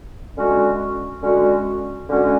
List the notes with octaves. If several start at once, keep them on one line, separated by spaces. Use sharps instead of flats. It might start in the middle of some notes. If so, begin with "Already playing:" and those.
D3 G#3 C#4 F#4
D3 G#3 C#4 F#4
D3 G#3 C#4 F#4